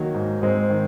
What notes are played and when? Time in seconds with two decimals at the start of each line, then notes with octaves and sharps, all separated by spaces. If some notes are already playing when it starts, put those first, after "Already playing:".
Already playing: D#3 F#3 A#3
0.14 G#2
0.42 G#2 G#3 C4
0.70 D#3